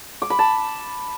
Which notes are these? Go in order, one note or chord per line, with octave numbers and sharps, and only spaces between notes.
D6
B5
A5